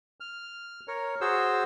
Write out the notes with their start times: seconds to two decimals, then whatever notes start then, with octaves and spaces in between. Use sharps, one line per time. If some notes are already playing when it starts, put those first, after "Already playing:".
0.20 F6
0.88 A#4 C#5
1.21 F#4 G#4 C5 E6